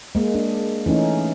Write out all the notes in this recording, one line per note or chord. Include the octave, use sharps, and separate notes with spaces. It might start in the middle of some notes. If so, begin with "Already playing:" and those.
G#3 A#3
D4
E3 A3 C#4 D#4